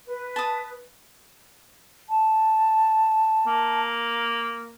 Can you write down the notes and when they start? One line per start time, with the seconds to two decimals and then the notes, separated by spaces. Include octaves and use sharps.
0.05 B4
0.36 A5 D#6
2.09 A5
3.46 A#3